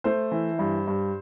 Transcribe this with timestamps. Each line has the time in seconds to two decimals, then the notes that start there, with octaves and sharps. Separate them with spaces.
0.04 A3 C5
0.32 E3
0.59 G2
0.88 G2